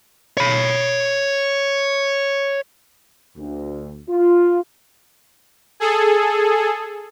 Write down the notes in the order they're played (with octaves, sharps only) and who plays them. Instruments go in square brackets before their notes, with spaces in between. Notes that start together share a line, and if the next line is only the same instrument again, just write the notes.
[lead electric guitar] C#5 B5
[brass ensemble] D2
F4
[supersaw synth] G#4 A4